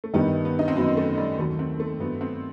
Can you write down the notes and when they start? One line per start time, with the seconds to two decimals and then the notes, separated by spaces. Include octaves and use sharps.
0.04 A3
0.13 G2 D#3 G3 B3 D#4
0.45 B3
0.59 D#4
0.68 C4
0.76 F#2 D#3 F#3 B3
0.97 A3
1.18 G3
1.39 D#2 D#3 F#3 A3
1.59 C4
1.80 A3
2.00 G2 F#3 A3 B3
2.21 C4